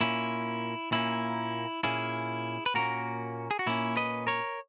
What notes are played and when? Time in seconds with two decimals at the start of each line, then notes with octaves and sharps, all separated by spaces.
0.01 A#2 A#3 C#4 E4
0.92 A#2 A#3 C#4 E4
1.83 A#2 A#3 C#4 E4 G#4
2.66 B4
2.74 A#2 A#3 C#4 F#4 A#4
3.51 G#4
3.59 F#4
3.66 A#2 A#3 C#4 E4
3.97 B4 D#5
4.27 A#4 C#5